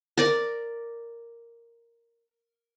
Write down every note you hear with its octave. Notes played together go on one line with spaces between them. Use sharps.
A#4 D5